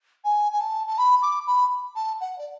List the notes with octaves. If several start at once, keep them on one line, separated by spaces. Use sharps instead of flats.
G#5
G#5
A5
A5
B5
D6
B5
A5
F#5
D5